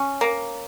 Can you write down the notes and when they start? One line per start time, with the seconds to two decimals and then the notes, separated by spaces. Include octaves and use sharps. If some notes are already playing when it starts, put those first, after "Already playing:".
Already playing: C#4
0.21 A#3